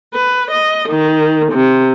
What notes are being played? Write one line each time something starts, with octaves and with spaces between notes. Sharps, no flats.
B4
D#5
D#3
C3